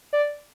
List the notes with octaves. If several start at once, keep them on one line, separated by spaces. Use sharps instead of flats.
D5